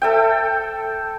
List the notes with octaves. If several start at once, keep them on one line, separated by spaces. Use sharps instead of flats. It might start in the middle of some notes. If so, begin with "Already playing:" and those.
A4 E5 G5